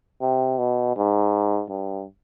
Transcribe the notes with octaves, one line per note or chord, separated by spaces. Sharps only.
C3
B2
G#2
G2